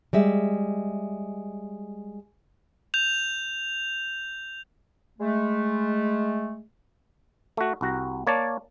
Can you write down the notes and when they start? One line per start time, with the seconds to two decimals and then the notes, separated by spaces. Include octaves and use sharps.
0.13 G3 G#3 E5
2.94 G6 F7
5.19 G#3 A3
7.57 A3 F#4
7.81 C2 F#4 A#5
8.27 A#3 C#5 D5 A5